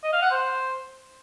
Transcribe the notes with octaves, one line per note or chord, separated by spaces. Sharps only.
D#5
F5
F#5
C5